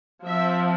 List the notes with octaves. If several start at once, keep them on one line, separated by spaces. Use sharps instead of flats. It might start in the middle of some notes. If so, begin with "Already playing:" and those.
F3 C4 E5